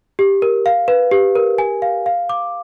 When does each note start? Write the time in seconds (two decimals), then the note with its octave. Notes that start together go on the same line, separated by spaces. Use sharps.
0.19 G4
0.42 A#4
0.66 F5
0.88 B4
1.11 G4
1.36 A#4
1.58 G#5
1.82 F5
2.06 F5
2.29 D6